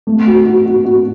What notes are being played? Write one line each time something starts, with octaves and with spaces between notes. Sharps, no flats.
A3
F#4
F#4
F#4
F#4